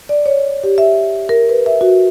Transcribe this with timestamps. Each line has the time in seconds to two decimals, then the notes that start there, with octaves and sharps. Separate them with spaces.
0.09 D5
0.26 C#5
0.63 G4
0.78 E5
1.29 A#4
1.49 B4
1.66 E5
1.81 F#4